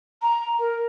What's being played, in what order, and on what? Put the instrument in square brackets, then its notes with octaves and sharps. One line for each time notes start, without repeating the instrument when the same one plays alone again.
[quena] A#5
A#4